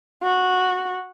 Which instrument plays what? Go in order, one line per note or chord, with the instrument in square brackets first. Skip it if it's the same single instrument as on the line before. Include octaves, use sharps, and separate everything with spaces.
[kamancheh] F#4